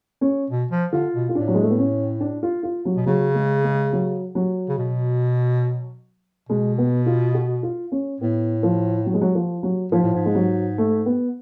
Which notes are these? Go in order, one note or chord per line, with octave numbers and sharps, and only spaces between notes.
C#4
B2
F3
D3 F4
B2
F4
A2 D4
F#3
G#3
A3
B3
C#4
D4
F4
F4
F#3
B2
C#3 F#3
G#3
G#3
F#3
F#3
C#3
B2
B2 G#3
B3
F4
F#4
F4
C#4
A2 B3
F3
F#3
G#3
F#3
F3
F#3
G#2 F3
A2
G#2
G#3
F#3
A3
B3